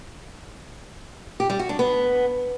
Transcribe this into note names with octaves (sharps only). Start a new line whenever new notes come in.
G4
G3
F#4
D4
B3